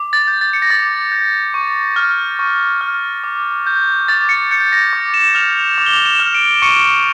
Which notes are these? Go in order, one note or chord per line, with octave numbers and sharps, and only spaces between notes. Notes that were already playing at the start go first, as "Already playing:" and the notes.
Already playing: D6
A6
G6
A6
C#7
A#6
D6 A6
G6
C#6
F6
C#6
F6
D6
G6
D6 A6
C#7
G6 C#7
A#6
D6
E7
F6 F7
F7
D6 F7
G7
F7
E7
F6
D7
C#6 C#7
D7
C#7